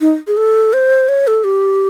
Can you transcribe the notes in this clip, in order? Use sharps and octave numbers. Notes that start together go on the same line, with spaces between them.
D#4
G#4
A4
C5
C#5
A4
G4